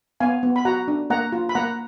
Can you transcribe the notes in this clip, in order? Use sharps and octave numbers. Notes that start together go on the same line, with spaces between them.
B3 F5 G#5
B3
B5
F#4 F#5 A#5
D4
A#3 F#5 A#5
F4
B5
A#3 F#5 A#5